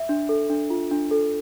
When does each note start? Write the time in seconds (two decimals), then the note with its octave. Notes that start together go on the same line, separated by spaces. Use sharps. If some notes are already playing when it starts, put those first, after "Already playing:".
Already playing: E5
0.09 D4
0.29 A4
0.50 D4
0.70 F4
0.91 D4
1.11 A4